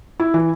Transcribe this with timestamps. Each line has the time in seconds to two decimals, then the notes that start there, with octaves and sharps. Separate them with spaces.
0.20 E4
0.34 E3